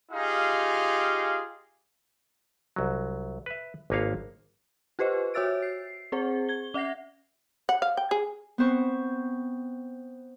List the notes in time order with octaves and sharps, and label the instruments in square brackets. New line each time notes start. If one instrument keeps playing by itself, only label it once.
[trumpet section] D#4 F4 G4 G#4 F5
[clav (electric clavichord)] C2 F#3
B4 E5
G#1 F3 A#3 B4 C#5 F5
[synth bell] F4 G4 B4 C5 D#5
F#4 C#5 E5 E6 A6 D7
C7
C4 G#4 C5 F#5
G#6 G7
C#4 E5 F#5 A#6 C7
[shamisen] F#5
F5
G5
G#4
[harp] B3 C4 C5 C#6